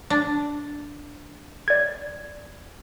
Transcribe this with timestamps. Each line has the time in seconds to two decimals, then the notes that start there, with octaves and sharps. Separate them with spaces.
0.10 D4
1.68 D5 G#6